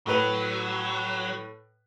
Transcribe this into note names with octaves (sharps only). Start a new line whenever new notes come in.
A2 F#3 B4 F7